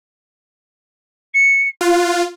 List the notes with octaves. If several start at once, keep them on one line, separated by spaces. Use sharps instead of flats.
C#7
F4 F#6